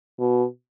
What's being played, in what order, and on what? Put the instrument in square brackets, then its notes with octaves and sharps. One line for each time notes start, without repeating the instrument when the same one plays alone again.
[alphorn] B2